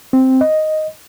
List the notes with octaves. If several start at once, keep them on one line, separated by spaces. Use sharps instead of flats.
C4
D#5